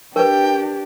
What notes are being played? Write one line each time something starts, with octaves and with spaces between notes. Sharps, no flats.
D4 G4 A#4 B4 G5